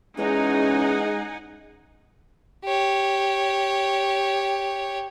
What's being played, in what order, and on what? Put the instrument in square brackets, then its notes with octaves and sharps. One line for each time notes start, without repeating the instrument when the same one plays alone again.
[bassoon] E2 [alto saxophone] G#3 [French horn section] C#4 [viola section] D#4 F#5 G#5
[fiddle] G4 C#5